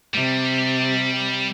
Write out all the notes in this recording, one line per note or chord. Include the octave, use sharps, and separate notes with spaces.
C3 G3